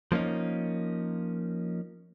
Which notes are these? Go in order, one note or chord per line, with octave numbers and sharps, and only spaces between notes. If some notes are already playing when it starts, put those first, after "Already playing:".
F3 A#3 C#4 D#4